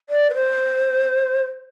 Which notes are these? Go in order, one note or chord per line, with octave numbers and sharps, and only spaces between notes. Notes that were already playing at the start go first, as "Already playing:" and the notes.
D5
B4
C5